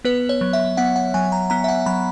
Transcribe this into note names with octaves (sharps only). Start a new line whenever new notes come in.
B3 B4
C#5
F#3
E5
B3 F#5
F#5
F#3 G#5
A#5
B3 A#5
E5
F#5
F#3 B5